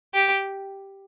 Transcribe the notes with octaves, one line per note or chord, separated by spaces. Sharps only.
G4